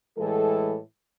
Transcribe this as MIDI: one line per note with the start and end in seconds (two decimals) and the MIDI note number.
0.18 0.77 45
0.18 0.77 52
0.18 0.77 56
0.18 0.77 69